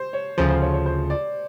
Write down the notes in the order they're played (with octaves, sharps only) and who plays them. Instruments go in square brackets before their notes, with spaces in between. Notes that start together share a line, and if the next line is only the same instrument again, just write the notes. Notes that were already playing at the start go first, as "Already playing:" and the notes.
Already playing: [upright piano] C5
C#5
[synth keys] D2 C#3 F3 [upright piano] C5
[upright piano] C5
C#5
C#5
C5
D5